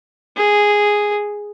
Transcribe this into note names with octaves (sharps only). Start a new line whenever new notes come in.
G#4